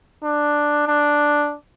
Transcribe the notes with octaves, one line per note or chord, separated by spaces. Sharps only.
D4
D4